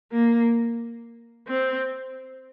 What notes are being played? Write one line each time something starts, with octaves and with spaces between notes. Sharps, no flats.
A#3
C4